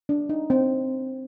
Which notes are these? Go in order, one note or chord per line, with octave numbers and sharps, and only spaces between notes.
D4
D#4
C4